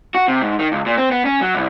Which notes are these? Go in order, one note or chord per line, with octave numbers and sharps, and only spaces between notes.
F#4
C3
G#2
D#3
C#2
A#2
C4
B3
C#4
F#3
C2